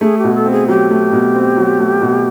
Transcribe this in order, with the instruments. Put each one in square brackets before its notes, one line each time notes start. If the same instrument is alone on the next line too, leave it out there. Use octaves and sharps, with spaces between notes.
[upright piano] A3 [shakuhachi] G#4
[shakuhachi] G4
[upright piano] B2
[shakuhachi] A4
[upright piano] C4
[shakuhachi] G#4
[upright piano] F#3 [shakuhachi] G4
[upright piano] A3
B2
C4
F#3
A3
B2